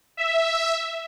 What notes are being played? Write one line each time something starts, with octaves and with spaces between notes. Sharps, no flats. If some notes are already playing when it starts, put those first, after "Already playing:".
E5